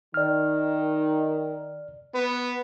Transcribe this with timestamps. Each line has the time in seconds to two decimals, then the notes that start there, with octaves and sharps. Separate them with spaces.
0.14 D#3 D5 F6
2.15 B3